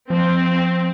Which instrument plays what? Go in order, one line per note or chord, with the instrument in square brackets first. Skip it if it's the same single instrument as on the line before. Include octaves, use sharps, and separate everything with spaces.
[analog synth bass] F3 [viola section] C4